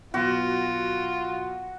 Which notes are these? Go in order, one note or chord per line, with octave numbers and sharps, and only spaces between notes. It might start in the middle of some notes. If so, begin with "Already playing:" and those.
B2 F#3 F4 F#4